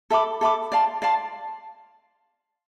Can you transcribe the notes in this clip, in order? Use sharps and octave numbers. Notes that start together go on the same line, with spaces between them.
A4 E5 B5 D6
A4 E5 B5 D6
D5 F5 A5 C6
D5 F5 A5 C6